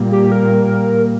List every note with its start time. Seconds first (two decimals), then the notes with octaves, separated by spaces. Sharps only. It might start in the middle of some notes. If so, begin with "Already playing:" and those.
Already playing: A#2 G3 A#3
0.12 G4
0.32 A#4